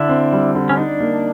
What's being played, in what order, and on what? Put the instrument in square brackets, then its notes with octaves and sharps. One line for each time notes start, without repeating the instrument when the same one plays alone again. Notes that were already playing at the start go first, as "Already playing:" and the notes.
Already playing: [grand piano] D3 [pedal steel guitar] D4 E4
[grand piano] C4
G3
D3
[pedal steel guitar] C#4
[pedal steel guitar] D4 [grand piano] D#4
[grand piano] A#3